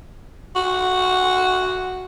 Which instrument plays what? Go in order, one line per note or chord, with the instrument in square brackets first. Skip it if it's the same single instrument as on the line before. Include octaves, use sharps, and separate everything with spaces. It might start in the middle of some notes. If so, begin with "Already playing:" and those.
[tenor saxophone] F#4